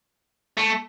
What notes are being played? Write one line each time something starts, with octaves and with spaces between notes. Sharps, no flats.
A3